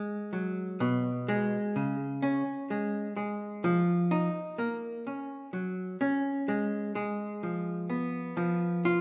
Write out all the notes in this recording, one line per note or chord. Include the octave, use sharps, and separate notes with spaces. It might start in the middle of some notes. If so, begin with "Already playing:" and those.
Already playing: G#3
F#3
B2
G#3
C#3
C#4
G#3
G#3
F3
D#4
A#3
C#4
F#3
C#4
G#3
G#3
F3
B3
F3
F4